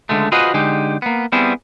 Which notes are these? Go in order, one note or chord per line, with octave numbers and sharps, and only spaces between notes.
C#2 F#2 D3 G#3 A3
F4 F#4 G#4 B4 C5 D#5
D3 G#3 D#4 G4
A#3 B3
G3 B3 C4 E4 G#4